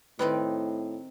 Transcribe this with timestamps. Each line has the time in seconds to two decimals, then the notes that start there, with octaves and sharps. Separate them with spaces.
0.19 A2 D#3 C4 D#4 B4 D5